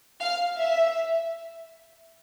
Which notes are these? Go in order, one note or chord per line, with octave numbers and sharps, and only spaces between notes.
F5
E5